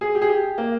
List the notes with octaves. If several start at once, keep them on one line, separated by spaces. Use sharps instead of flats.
G#4
G4
G#4
G4
A#3